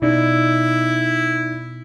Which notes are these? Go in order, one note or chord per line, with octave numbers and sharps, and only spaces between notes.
B2 D#4 E4 D5